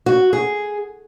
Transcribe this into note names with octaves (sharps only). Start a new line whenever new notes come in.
F#4
G#4